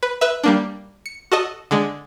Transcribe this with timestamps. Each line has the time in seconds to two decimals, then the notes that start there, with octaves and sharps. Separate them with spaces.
0.03 B4
0.21 B4 E5
0.44 G3 A#3 D4
1.06 C#7
1.32 F#4 A4 D#5
1.71 D3 G#3